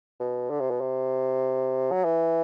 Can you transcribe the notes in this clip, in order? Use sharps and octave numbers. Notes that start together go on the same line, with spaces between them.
B2
D3
C3
B2
C3
F#3
E3